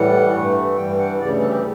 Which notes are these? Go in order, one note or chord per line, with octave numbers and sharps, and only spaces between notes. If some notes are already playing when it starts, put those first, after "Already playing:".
Already playing: A2 E3 G3 F#5
G2 E3 A3
G2 E3 G3 G5
F#5
D2 C#3 E3 G3 D5
A4
G4